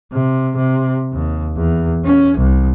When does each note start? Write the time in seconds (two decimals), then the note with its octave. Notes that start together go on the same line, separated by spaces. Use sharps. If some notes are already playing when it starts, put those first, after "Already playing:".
0.13 C3
0.56 C3
1.14 D#2
1.56 E2
2.05 C#4
2.37 C2